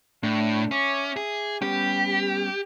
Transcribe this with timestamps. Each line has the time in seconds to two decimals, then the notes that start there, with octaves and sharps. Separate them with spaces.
0.23 A2 A3 D4
0.71 C#4 E5 D6
1.16 G#4
1.62 G3 B3 C#4 G4